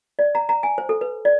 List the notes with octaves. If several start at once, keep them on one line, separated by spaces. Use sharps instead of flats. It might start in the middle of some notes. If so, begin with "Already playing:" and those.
D5
A#5
A#5
G#5
C5
A4
B4
D5